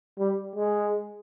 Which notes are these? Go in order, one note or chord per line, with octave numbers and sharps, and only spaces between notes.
G3
G#3